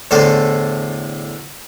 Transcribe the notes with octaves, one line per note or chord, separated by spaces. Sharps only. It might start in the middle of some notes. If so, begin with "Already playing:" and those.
E2 A2 D3 A3 C5 D5